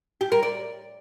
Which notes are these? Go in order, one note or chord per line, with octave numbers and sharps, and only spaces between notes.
G4
A#4
D5